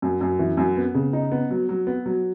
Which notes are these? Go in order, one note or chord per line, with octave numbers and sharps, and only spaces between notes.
F#2
F#2
E3
F#2
B3
C#3
D#4
B3
F#3
F#3
B3
F#3